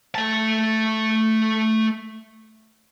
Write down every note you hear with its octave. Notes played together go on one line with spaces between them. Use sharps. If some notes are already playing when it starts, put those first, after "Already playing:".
A3 A5